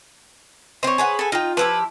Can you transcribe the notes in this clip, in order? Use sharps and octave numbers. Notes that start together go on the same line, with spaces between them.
C4 C5 C#5 D#5
G#4 B4 F#5
A4 G#5
D#4 F4 G5
F3 E4 G4 B4